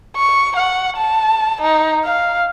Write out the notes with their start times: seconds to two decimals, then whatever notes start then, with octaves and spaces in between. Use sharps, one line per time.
0.16 C#6
0.56 F#5
0.97 A5
1.62 D#4
2.04 F5